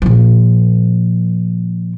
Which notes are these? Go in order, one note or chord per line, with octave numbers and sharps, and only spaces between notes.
A#2 F3